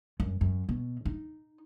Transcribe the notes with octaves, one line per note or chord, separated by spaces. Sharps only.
F#2
F#2
B2
D#4